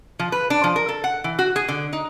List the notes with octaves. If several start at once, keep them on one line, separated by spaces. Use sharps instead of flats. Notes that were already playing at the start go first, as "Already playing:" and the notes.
F3
B4
D4
F3
A#4
A4
F#5
E3
F#4
G#4
D3
D#4